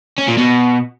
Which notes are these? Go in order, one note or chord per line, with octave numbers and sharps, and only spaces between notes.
C#4
A#2
B2